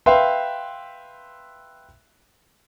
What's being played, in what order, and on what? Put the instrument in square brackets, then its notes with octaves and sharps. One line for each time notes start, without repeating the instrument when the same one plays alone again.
[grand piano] B4 E5 F5 G5 C6